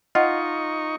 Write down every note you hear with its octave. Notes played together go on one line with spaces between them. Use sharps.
D#4 F4 D#5 F#5 C#6